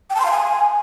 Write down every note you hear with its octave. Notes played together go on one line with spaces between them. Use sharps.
G5
A5
C6
F5
G#5